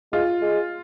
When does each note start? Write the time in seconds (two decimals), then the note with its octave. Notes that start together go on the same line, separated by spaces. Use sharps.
0.12 G#3 F4
0.41 G#3